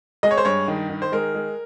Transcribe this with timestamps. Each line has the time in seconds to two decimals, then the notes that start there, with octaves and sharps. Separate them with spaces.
0.23 G#3 D#5
0.31 C#5
0.37 C5
0.45 G2 C#5
0.68 D#3
0.90 D#3
1.02 C5
1.12 G#3 A#4
1.35 G#3